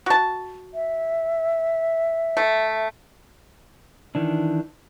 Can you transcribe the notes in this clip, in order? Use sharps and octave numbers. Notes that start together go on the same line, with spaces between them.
F#4 A5
E5
A3
D#3 E3 D4